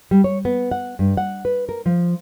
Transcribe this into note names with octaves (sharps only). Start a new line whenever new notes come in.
G3
C#5
B3
F#5
G2
F#5
B4
A#4
F3